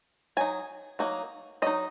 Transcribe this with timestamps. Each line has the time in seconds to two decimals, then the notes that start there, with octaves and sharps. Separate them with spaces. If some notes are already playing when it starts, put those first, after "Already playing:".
0.37 F#3 D#4 G#5
0.99 F#3 A#3 D#4
1.62 F#3 D#4 D#5